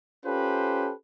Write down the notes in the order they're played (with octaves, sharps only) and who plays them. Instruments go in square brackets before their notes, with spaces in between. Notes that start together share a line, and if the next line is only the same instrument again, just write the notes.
[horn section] C#4 F4 G4 A4 B4 C5